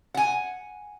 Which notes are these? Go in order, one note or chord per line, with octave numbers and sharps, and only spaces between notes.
F#5 G#5